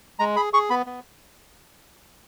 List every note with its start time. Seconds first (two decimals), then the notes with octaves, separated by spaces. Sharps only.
0.19 G#3 A#5
0.36 G#4 B5
0.53 G#4 C#6
0.70 B3 B5
0.86 B3